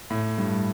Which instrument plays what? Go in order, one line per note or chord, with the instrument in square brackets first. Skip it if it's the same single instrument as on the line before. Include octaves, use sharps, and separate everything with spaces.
[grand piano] A2
G2